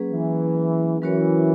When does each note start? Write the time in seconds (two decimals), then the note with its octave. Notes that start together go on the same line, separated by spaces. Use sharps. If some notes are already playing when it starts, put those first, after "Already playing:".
Already playing: F#3 A#3 C#4 G#4 B4
0.11 E3
1.01 E3 F#3 C#4 F#4 A#4 C#5